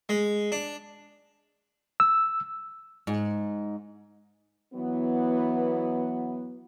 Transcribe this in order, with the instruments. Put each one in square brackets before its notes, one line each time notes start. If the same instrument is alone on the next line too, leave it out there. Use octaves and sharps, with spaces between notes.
[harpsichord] G#3
D4
[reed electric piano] E6
[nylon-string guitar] G#2
[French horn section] E3 F#3 B3